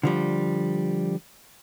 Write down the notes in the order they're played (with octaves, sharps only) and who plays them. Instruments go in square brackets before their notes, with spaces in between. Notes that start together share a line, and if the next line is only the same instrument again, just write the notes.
[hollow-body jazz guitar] D3 F3 G3